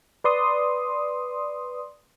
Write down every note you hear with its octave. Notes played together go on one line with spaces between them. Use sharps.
B4 D5 C6 D#6